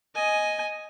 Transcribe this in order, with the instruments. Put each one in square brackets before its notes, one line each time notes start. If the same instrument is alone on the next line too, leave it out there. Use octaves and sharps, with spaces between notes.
[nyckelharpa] D#5 G#5